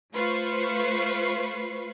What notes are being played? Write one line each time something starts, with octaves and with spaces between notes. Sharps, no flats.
A3 F4 B4 C5 C#6 C7